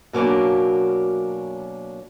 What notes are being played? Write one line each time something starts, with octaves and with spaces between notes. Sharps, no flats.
B2 F#3 A#3 C#4 D4